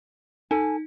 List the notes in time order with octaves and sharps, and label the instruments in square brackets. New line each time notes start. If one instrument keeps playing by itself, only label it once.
[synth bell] D#4 [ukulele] A4 G#5